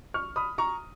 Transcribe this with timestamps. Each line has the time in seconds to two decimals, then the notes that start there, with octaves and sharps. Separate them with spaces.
0.14 C#6 F6
0.36 B5 D#6
0.58 A#5 C#6